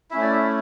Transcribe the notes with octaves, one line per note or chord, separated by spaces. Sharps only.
A3 C#4 E4 E5
D5
E5